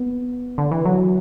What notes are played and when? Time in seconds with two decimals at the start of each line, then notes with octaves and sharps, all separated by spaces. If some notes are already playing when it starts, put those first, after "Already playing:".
Already playing: B3
0.58 D3
0.72 E3
0.85 F#3